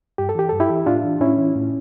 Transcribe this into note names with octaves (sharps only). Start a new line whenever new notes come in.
G2 G4
A4
E3 G4
G2 A4
E4 G4
E3
A2 D4 F4
E3
A2 C#4 E4
E3
A2